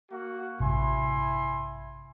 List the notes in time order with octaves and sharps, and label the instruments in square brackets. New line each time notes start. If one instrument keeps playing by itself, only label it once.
[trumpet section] A#3 F#4
[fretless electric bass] A1 G2 C3 [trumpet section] E4 G#5 C6